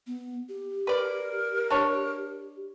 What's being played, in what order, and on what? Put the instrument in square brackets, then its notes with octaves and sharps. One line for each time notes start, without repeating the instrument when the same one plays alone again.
[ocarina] B3
G4
[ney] A#4 [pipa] B4 D5
[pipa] D4 C#5